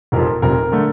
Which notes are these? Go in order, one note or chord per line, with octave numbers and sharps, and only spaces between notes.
F1 F2 C3 F3 A#4
F1 F2 C3 F3 A#4
D3 A3